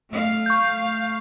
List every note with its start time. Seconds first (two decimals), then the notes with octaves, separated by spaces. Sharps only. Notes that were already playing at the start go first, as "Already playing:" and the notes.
0.10 A3 F5
0.46 C#6 G6